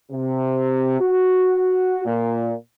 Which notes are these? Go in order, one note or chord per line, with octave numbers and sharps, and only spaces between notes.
C3
F#4
A#2